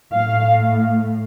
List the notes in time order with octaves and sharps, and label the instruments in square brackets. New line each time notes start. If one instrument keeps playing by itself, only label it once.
[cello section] A2 A3 F5